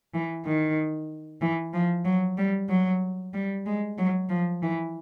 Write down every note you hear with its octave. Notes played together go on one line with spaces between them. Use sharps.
E3
D#3
E3
F3
F#3
G3
F#3
G3
G#3
F#3
F3
E3